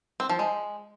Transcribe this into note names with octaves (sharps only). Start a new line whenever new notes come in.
C4
F3
G#3